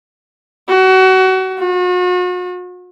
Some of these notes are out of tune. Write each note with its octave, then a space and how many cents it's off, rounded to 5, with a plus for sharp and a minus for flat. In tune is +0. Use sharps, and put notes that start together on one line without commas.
F#4 +30
F#4 -40